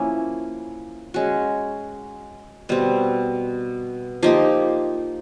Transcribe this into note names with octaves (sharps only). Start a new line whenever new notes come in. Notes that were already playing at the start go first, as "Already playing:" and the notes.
Already playing: F3 A#3 C#4 E4
G#3 C#4 F#4
B2 G3 C4
F3 A#3 D#4 G4